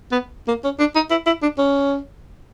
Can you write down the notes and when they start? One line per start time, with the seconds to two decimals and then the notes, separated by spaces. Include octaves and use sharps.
0.11 B3
0.48 A#3
0.64 C#4
0.79 D4
0.95 D#4
1.11 E4
1.26 E4
1.42 D4
1.58 C#4